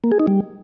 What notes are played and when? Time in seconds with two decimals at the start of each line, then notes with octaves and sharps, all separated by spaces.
0.04 A#3
0.12 G#4
0.20 D#4
0.27 G3